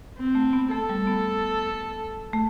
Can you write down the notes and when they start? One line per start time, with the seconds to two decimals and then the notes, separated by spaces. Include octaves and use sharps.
0.18 C4
0.35 A3
0.53 B3
0.71 A3 A4
0.89 G3
1.07 B3
2.33 A3